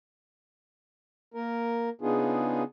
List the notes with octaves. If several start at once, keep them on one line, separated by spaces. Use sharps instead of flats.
A#3 A#4
C#3 B3 D4 D#4 F4 G#4